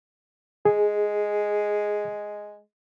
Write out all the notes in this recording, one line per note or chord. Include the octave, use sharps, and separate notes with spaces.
G#3 G#4